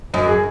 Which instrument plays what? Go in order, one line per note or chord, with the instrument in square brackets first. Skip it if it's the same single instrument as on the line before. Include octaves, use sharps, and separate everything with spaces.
[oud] F#2 [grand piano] D#5
[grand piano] G#4